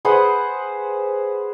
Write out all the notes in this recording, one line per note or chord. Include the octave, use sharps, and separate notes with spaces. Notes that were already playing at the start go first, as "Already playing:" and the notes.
G#4 B4 C5 F#5